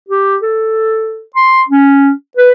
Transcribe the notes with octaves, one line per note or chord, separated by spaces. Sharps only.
G4
A4
C6
C#4
B4